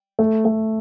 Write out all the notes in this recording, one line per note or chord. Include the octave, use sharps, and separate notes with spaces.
A3
A3